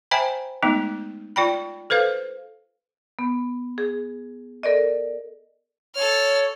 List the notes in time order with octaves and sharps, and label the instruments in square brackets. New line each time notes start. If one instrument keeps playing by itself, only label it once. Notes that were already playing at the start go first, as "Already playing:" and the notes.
[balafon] C5 E5 G5 G#5 A#5 B5
G#3 A3 B3 D#4
F4 D5 G5 B5
A4 B4 C5 F5
[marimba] B3
G#4
A4 A#4 D5 D#5
[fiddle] A4 F6 [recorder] C#5